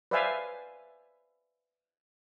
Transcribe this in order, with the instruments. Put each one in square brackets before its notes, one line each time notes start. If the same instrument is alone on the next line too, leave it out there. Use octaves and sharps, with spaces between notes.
[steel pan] B4 C5 D5 E5 F5 G#5